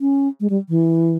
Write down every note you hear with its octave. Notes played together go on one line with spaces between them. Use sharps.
C#4
G#3
G3
E3